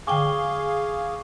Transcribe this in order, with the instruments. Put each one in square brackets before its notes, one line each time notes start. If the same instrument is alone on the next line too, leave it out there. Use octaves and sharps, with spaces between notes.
[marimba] D3 G5 G#5 [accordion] G#4 F5 [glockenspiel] C#6 D6 G7